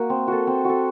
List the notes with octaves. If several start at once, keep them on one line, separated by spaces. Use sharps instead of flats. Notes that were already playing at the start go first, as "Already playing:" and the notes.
Already playing: A#3 F#4 A#4
C4
F#4 A4
C4
F#4 A4